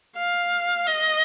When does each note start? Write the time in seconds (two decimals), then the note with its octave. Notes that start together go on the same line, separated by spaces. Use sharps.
0.17 F5
0.87 D#5